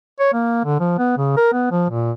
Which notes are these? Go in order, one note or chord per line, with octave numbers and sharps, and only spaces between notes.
C#5
A#3
D3
F3
B3
C#3
A#4
B3
F3
A#2